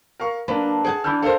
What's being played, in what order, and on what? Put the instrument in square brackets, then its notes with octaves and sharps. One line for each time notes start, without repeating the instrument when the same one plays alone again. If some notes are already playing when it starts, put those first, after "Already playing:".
[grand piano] A#4 F5 C#6
[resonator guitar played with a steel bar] F#3 D4 [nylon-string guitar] A#3 B4 [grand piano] A5
[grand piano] G#4 [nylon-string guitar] F#5 G5 A5
[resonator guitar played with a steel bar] E3 D4 [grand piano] E6 F6 G6
[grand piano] A4 C5 [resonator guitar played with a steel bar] A#4 D5 F5